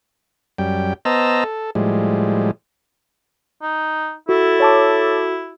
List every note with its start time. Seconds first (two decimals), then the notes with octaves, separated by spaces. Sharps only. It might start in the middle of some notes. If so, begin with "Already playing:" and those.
0.58 F#2 G3 G5
1.05 B3 C5 D#5 A5 A#5 E6
1.44 A4
1.75 A2 F3 G3 G#3
3.62 D#4
4.29 E4 F#4 A4
4.60 C#5 A5 D6